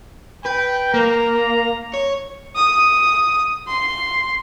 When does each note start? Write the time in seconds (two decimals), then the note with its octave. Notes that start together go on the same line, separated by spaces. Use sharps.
0.45 B4 G5
0.94 A#3 A#5
1.94 C#5
2.56 D#6
3.67 C6